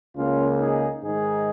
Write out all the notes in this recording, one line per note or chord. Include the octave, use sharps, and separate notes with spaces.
C#2 C#3 A#3 C#4 F4
D#4 G#4
G#2 D#3 G#3 D#4 G#4